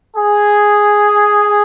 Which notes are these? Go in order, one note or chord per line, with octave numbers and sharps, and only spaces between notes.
G#4